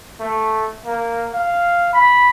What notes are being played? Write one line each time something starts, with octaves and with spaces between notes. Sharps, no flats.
A3
A#3
F5
B5